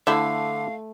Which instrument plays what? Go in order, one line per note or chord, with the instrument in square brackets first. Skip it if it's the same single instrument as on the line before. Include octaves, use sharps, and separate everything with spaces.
[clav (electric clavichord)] D3 [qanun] A3 [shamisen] E4 C5 E5 [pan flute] F5